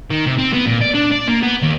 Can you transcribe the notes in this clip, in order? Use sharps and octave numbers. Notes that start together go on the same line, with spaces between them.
D#3
C3
C4
B3
A#2
D5
D4
D5
A#3
B3
D#2